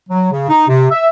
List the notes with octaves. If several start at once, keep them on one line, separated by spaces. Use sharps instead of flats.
F#3
C#3
D#4
C3
E5